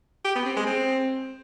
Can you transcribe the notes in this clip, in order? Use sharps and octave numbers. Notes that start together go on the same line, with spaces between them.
G4
B3
C4
G#3
C4